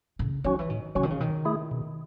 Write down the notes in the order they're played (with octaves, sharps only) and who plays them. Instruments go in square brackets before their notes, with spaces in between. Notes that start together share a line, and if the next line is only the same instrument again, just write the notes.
[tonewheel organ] A2 [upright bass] C#3
[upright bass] D#3 [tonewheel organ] F#3 C#4 F#4
[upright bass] E3
[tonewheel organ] A2 [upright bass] D#3
[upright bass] C#3 [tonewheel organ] F#3 C#4 F#4
[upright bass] D#3
C#3
[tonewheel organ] B2 [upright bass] D#3
[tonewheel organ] A3 E4 G#4
B2